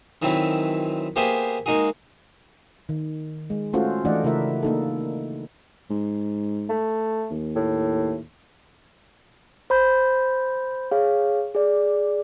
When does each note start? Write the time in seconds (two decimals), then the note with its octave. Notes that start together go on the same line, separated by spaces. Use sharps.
0.22 D#3 E3 F#3 C4 E4
1.16 A#3 B3 G4 G#4 C5 E5
1.66 G#3 A#3 D#4 F#4 G#4
2.89 D#3
3.50 G#3
3.73 A3 C#4 F4 F#4 A4 C5
4.05 E3 A3 D4 D5 D#5 F#5
4.24 C#3 A3 E4 A#4 E5
4.63 A#3 D#4 A4
5.90 G#2
6.69 A3
7.30 D#2
7.56 A2
9.70 C5 B5 G6
10.91 G#4 C#5 F5
11.55 G#4 D5